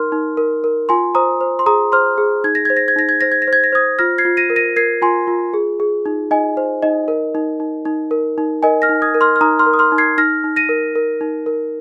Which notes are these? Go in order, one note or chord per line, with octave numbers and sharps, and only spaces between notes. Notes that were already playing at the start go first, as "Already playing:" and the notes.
Already playing: D#4 A#4 C6 F6
D#4
A#4
A#4
F4 G#5 C6
C5 A#5 D#6
C5
C6
G#4 A#5 D#6
C5 C6 F6
G#4
D#4 G#6
A#6
C5 G#6
A#6
G#6
D#4 A#6
G#6
C5 A#6
G#6
A#6
C5
G#6
A#6
C5 D#6 G#6
F4 F6 A#6
G#6 C7
F4
A#6 D#7
A#4
A#6 D#7
A#4 G#6 C7
F4 G#5 C6
F4
G#4
G#4
D#4
D#4 D#5 G#5
C5
D#4 D#5
A#4
D#4
D#4
D#4
A#4
D#4
A#4 D#5 G#5
F6 A#6
D#4
D#6 G#6
A#4
C6 F6
F6
D#4 A#5 D#6
C6 F6
A#4
D#6
C6 F6
D#4
G#6 C7
D#4 F6 A#6
D#4
A#6 D#7
A#4
A#4
D#4
A#4